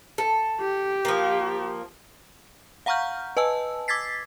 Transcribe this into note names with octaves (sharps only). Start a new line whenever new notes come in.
A4
G4
F3 A#3
F5 F#5 A#5 C#6 F6 G6
B4 D#5 G#5 A5 E6
D6 E6 G#6 A6 B6 C7